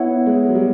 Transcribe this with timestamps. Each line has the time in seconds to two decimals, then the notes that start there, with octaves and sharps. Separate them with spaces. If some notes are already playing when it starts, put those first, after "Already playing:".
Already playing: B3 E4 C#5 F#5
0.26 G#3
0.49 F#3
0.55 G3